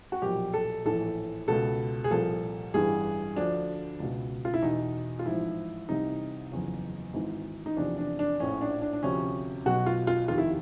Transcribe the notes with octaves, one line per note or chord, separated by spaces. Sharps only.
F#4
B1 A#2 F3 G4
A4
A#1 A2 E3 A4
C#2 B2 A4
G#4
C2 A#2 F3 A4
A1 G2 E3 G#4
D2 D3 F3 D4
C#2 B2
F4
E4
E2 B2 D#4
F4
A1 G#2 F3 E4
C2 C3 E3 D#4
F#1 E2 C#3 F3
G#1 G#2 E3
D#4
E2 C3 F3 D4
D4
D4
A#1 A2 F3 C#4
D4
D4
D4
D2 C3 F3 C#4
B1 B2 F#4
F4
F4
F1 D#2 D#3 F4
E4